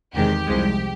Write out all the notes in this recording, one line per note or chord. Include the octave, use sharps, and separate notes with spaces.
E2 C3 D#3 G#3 G4
C2 C3 F3 G#3